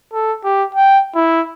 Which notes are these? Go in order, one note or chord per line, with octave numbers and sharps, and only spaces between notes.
A4
G4
G5
E4